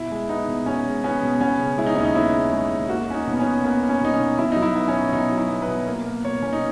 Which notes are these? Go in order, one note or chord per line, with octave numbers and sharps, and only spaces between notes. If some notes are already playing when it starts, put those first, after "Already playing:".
Already playing: B2 E4
G#3
B3 D#4
B2
B2 C#4
G#3
B3 C#4
B2
B3 C#4
C#3
G#3 E4
D#4
D#2 C#4
D#4
B3 E4
C#3
G#3
D#2
A#3 F#4
A#3 C#4
D#4
B2
B3
C#4
B2
A#3 B3
A#3
C#4
B2 D#4
C#4
B2
B2 E4
F#3 D#4
E4
B3
C#4
B2
B2 D#4
F#3
E4
B3
B4
B2
A#3
A#3
B2 C#5
B2 C#4
D#4